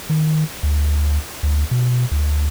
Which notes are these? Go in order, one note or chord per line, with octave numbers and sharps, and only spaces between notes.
D#3
D2
D2
B2
D2